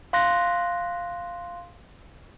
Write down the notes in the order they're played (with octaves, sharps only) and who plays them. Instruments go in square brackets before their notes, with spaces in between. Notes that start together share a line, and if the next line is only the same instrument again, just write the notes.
[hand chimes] F5 C6 F#6 A#6